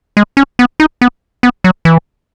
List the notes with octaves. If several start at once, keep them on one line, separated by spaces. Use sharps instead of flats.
G#3
C#4
B3
D#4
B3
B3
F#3
E3